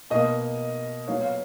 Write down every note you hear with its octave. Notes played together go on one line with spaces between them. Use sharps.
B2 A#3 D#5
A#2 F#3 B3 C#5 F5
F5